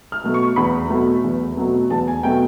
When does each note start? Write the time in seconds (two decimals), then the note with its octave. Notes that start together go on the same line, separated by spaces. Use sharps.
0.12 F6
0.24 B2 F#3 A3
0.34 C#6
0.56 E2 B5
0.90 B2 F#3 A3
1.24 E2
1.57 B2 F#3 A3
1.90 E2 A5
2.08 G#5
2.23 B2 F#3 A3 G5